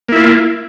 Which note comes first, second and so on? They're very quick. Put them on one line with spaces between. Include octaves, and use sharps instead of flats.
A#3 E4 F4